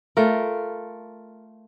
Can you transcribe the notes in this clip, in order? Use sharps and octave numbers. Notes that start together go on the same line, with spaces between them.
A3 F4 A#4